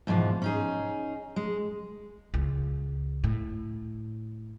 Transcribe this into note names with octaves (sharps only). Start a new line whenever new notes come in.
E2 G#2 B2 F3
C#4 D#4 G#4
G#3
C#2
A2